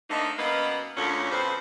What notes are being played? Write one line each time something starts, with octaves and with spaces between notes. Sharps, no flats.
D3 A3 A#3 C4 D#4
F#2 A#3 B3 B4 D#5 F5
D2 A#2 C#4
F2 C#3 B4 C5